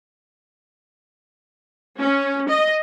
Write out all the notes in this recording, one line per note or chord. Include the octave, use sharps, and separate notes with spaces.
C#4
D#5